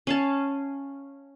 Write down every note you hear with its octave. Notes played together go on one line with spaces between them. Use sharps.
C#4 F5 A5